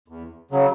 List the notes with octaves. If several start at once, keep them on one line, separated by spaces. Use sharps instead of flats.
E2
C#3 F#3